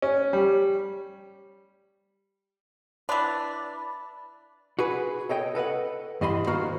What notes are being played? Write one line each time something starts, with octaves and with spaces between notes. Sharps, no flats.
C#4
G3
E3 D4 B4
F#4 G#4 B4
A4 C#5 D#5 G5
A4 B4 D#5 F#5
G2 E3 D#5 B5 C6
D#3 A#3 F#4 C5